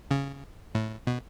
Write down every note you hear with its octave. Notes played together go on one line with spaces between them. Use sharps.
C#3
A2
B2